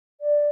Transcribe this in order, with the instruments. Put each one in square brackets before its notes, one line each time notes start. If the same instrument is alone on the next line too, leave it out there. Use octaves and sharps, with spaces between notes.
[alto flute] D5